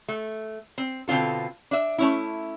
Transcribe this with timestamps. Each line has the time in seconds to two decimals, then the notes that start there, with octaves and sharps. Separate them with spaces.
0.08 A3
0.78 C4
1.08 B2 D3 C4 F4 A4
1.71 D4 E5
1.98 A3 C#4 E4